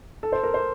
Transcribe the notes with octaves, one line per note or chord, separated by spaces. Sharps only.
A4
C5
A#4
C5